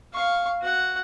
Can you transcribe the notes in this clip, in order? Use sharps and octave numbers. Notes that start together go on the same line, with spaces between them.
F5 C#6
F#4 F#5